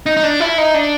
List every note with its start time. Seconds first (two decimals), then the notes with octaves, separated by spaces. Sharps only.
0.06 D#4
0.17 D#4
0.23 D4
0.40 E4
0.58 D#4
0.74 D4